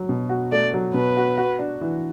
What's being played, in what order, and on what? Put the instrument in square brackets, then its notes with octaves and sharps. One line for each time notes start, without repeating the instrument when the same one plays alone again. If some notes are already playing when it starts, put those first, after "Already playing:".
Already playing: [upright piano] F#3
B2
F#4
[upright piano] A3 [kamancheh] D5
[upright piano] F#3
[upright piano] B2 [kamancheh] B4
[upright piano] F#4
F#4
D4
E3